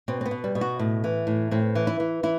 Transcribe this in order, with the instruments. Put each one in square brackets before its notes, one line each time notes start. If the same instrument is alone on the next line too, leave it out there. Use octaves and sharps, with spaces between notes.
[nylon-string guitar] B2 C4
C4
B3
B2
G3
B2
F#4
A2
E3
A2
A2 C4
E3
E4
E3
E3 E4